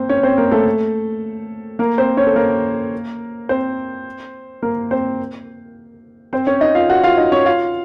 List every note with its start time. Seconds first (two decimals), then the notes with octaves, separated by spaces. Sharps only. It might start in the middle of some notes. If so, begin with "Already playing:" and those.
Already playing: A#3 C4 C5
0.09 C#4 C#5
0.23 C4 C5
0.38 A#3 A#4
0.51 A3 A4
1.79 A#3 A#4
1.98 C4 C5
2.17 C#4 C#5
2.27 A4
2.36 A#3 A#4
3.49 C4 C5
4.63 A#3 A#4
4.91 C4 C5
6.33 C4 C5
6.47 C#4 C#5
6.61 D#4 D#5
6.75 F4 F5
6.89 F#4 F#5
7.04 F4 F5
7.17 D#4 D#5
7.32 C#4 C#5
7.46 F4 F5